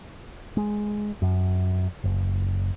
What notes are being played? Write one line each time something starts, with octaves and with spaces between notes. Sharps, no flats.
G#3
F#2
F#1